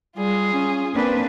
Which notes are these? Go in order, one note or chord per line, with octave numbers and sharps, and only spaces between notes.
G3 F4 G#4
C#4
A#3 C4 D4 B4